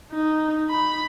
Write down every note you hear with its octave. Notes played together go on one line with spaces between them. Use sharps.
D#4
B5